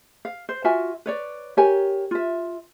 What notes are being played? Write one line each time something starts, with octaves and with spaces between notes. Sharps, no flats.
F5
C5
F4 F#4 E5 G#5
B4 C#5 D5
G4 A#4 C#5 G#5
F4 E5